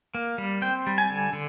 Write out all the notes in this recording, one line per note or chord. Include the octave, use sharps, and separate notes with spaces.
A#3
G3
C4 G5
G3
G#5
D3
D3